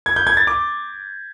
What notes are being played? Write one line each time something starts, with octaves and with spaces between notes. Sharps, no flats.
G#6
G6
G#6
A6
D6